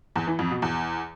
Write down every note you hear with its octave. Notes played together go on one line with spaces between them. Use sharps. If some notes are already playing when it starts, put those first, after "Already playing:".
E2
E3
F2
B2
E2